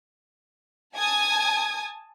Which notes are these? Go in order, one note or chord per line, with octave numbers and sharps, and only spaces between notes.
G#5 A5 D#6 G#6